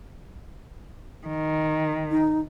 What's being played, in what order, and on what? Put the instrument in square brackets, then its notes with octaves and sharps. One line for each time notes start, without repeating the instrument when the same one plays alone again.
[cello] D#3
[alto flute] D#4